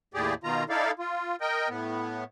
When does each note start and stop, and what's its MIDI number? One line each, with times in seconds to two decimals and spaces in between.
0.14 0.34 39
0.14 0.34 45
0.14 0.34 67
0.14 0.34 68
0.14 0.34 74
0.44 0.64 47
0.44 0.64 51
0.44 0.64 65
0.44 0.64 82
0.69 0.91 63
0.69 0.91 64
0.69 0.91 69
0.69 0.91 74
0.69 0.91 77
0.99 1.36 65
1.41 1.69 70
1.41 1.69 75
1.41 1.69 79
1.69 2.24 45
1.69 2.24 59